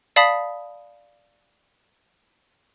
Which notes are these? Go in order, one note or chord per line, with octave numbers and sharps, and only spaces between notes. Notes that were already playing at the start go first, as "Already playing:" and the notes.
D5 F5 A5 B5 D#6 B6